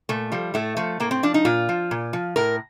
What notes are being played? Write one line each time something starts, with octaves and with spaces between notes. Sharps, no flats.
A#2 A3
F3 G3
A2 A3
F3 A3
A2 A#3
C4
F3 D4
D#4
A#2 F4
F3
A#2
F3
A2 A#4